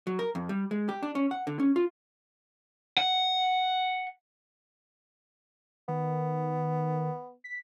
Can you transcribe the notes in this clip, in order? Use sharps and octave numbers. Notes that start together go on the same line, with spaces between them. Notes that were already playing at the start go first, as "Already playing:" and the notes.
F#3
A#4
F2
G3
G#3
G4
D4
C#4
F#5
D3
C#4
F4
F#5
D#3 B3
B6